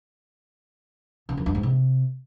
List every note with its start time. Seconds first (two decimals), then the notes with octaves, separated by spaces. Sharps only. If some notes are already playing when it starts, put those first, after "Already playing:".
1.29 C#3
1.37 F#2
1.46 G2
1.55 G#2
1.63 C3